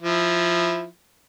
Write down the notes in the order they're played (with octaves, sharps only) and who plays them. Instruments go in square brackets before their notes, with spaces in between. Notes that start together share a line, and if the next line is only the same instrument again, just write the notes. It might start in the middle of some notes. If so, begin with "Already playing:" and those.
[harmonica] F3 E4